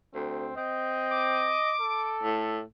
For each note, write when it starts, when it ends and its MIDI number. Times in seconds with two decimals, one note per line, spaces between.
0.14 0.50 38
0.14 0.53 60
0.56 1.57 60
0.56 1.74 75
1.12 2.33 86
1.81 2.61 69
2.23 2.61 45